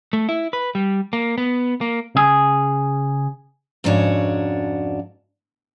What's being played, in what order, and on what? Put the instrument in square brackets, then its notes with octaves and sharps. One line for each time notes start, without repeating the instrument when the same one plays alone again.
[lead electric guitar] A3
E4
B4
G3
A#3
B3
A#3
[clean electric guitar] C#3 G#4
[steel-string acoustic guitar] F2 G#2 C#3 D4 F#4 C#5